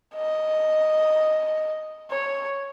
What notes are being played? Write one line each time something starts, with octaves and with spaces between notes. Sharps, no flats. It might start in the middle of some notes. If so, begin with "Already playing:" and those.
D#5
C#5